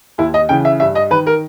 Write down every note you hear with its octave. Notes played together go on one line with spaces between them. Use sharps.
D#2 E4
D#5
C#3 E3 G5
E5
G2 E5
D#5
D#3 B4
A#4